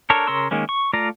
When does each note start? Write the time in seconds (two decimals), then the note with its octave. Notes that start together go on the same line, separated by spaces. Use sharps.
0.10 D4 A4 A#4 C#5
0.27 C#3 A#4 C#5 C6 E6
0.51 D#3 G#3 A#3 C#4
0.69 C#6
0.93 A3 F4 D5 F5 A#5